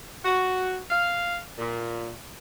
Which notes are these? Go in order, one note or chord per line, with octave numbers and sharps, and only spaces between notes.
F#4
F5
A#2